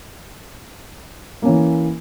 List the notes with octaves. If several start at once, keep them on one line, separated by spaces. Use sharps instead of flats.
E3 A#3 C#4